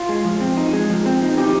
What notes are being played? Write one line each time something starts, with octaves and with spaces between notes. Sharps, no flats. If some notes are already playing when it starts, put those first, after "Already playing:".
Already playing: F4
G#3
F3
C4
D#4
G#3
F3
C4
D#4
F3 D#4 G4